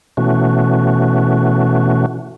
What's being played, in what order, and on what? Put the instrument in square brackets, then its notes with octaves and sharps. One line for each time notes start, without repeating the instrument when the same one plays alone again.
[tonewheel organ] B2 E3 A3 C#4 F#4